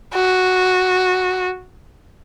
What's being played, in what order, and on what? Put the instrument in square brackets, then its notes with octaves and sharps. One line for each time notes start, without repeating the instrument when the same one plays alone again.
[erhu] F#4